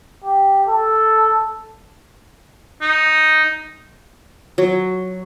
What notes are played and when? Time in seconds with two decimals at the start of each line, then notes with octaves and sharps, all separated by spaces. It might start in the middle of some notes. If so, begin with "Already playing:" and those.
0.24 G4
0.68 A4
2.81 D#4
4.58 F#3